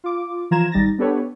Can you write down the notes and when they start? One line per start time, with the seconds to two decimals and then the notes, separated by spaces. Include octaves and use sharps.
0.04 F4 D6
0.51 E3 F3 F4 A#5 G#6 E7
0.72 G#1 G3 D#4 A6 A#6
0.98 B3 D4 G4 A4 B4 C#5